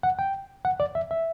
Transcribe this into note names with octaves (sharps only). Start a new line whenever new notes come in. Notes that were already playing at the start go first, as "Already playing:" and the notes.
F#5
G5
F#5
D5
E5
E5